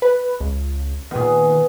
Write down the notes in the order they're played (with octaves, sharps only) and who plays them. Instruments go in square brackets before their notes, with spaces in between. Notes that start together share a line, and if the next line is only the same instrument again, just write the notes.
[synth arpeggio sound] B4
C#2
[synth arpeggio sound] A#2 D#3 [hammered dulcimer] B3 G#4